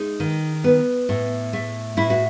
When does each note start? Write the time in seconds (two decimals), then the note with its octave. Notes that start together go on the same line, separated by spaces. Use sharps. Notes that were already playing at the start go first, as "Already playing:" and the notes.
Already playing: G#3 D#4
0.20 D#3
0.64 B3
1.09 A2
1.53 A3
1.97 A2 E4
2.10 F#4